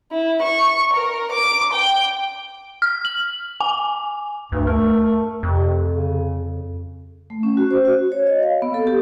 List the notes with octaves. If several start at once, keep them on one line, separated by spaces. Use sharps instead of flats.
E4
C#6
A#4
D6
G5
F6
F#7
G#5
D2 G2
A3 A#4
F2 C3
C#3
A3
C#4
F#4
C5
F#4
C#5
D#5
F5
B3
A4
G4